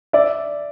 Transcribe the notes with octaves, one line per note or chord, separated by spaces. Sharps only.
D5 E5